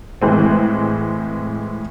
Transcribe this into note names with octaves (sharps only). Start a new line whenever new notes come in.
A2 E3 G#3 C4